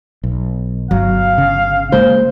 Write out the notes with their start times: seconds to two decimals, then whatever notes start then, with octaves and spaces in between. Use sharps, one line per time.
0.24 B1
0.91 G1 F#3 F5
1.38 C#3
1.92 C#3 G#3 A#3 C5